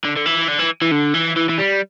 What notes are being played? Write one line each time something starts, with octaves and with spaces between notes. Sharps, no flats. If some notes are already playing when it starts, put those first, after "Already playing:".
D3
D3
E3
D3
E3
E3
D3
E3
E3
E3
G3